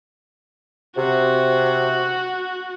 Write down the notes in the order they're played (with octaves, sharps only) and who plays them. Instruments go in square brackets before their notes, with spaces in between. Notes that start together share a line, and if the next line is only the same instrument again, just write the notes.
[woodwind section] C3 [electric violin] F#4